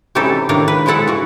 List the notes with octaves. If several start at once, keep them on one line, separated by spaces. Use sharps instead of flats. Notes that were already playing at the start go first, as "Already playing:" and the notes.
C3 E3 C#4 D#4 G4 A4
A2 D#3 A#3 D4 A#4
B4
F3 G#3 E4 A4 F#5
E3 F#4